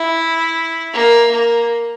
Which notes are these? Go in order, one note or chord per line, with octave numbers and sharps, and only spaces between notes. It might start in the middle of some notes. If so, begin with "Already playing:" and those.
Already playing: E4
A#3
A#3